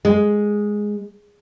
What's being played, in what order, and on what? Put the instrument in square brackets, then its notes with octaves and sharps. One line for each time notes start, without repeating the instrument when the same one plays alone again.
[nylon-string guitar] G#3